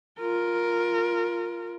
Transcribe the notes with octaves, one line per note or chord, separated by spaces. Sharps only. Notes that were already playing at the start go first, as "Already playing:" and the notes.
F4 A#4